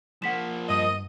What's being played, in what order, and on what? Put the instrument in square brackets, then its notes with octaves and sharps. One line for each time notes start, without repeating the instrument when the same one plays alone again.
[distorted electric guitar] F3 A#3 [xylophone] F#5 B6 E7
[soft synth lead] G2 [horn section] D#5